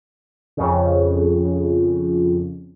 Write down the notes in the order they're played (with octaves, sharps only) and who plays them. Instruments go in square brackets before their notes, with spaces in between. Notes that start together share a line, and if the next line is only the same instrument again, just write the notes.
[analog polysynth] F2 C#3